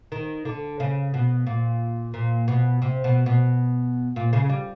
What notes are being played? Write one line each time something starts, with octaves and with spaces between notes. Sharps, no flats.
D#3
D3
C#3
B2
A#2
A#2
B2
C3
B2
B2
A#2
C#3
G3